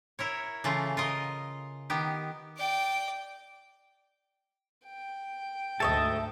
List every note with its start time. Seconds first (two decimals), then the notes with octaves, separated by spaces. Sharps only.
0.19 E4 A#4 C#5
0.64 C#3 E3 A3 F4
0.97 F4 A#4 D#5
1.90 D#3 B3 G4
2.57 D5 G5
4.86 G5
5.80 D2 G#2 A4 C#5 D#5 E5 A5